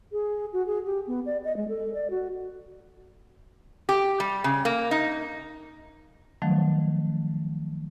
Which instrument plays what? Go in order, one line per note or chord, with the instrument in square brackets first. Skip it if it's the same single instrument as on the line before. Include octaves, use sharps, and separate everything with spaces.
[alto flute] G#4
F#4
G#4
G4
B3
D5
D#5
G#3
A4
D5
F#4
[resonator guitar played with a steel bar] G4
G3
C#3
A#3
D#4
[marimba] D#3 F3 F#3 A3 C#4